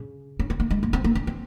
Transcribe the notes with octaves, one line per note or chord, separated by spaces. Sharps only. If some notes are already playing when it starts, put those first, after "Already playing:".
Already playing: C#3
C#4
C4
A#3
G#3
A#3
C4
A#3
C#4
C4